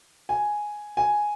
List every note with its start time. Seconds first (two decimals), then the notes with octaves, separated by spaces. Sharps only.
0.29 G#5
0.97 G#5